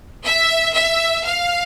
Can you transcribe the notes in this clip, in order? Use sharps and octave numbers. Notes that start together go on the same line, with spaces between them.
E5
E5
F5